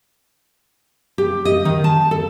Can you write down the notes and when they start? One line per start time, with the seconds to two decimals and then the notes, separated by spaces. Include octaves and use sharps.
1.18 G4
1.45 D#5
1.65 D#3
1.84 A5
2.11 A4